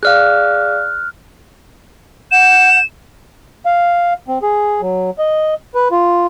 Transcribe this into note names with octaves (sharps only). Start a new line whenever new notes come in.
G#4 D5 F5 F6 F#6
F#5 G6 E7
F5
C4
G#4
F#3
D#5
B4
F4